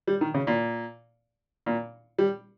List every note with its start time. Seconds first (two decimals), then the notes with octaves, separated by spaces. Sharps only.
0.08 G3
0.21 D#3
0.34 C#3
0.47 A#2
1.66 A#2
2.19 G3